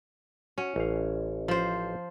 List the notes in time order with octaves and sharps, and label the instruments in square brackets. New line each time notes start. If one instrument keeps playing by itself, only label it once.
[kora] C#4 [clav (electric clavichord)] F#4
[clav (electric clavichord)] A1 F5
[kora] F3 C5